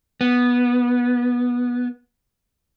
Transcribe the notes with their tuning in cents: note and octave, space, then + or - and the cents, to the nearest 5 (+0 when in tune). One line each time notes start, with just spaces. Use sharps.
B3 -15